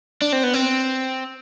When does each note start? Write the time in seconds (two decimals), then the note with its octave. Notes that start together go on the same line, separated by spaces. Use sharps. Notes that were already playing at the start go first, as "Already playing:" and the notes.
0.21 D4
0.32 C4
0.43 B3
0.53 C4